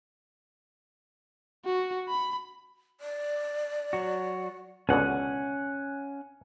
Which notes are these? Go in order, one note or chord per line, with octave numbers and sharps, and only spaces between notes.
F#4
B5
D5
F#3 F#4
C#2 B2 D3 C#4 F#5